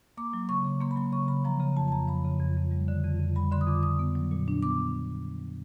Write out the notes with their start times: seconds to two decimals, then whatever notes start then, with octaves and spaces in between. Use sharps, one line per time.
0.17 A#3 D6
0.33 F#3
0.49 C#3 C#6
0.65 C#3
0.80 A#3 C6
0.91 B5
0.96 F#3 C6
1.13 C#3 C#6
1.28 C#3 B5
1.45 F3 A#5
1.60 C#3 A#5
1.77 F2 A5
1.88 A5
1.92 F2 A#5
2.08 F3 B5
2.25 C#3
2.40 F2
2.57 F2
2.71 G3
2.88 D3
3.04 F2
3.19 F2
3.35 G3 B5
3.51 D3 C6
3.61 D#6
3.67 F2 D6
3.83 F2 D#6
3.99 B3
4.15 F#3
4.31 A#2
4.48 D4
4.63 B3 D6